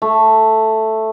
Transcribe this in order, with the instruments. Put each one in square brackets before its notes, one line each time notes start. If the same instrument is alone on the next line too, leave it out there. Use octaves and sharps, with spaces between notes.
[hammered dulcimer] A3